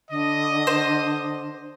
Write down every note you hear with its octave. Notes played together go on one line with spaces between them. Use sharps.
D3 D#5
C5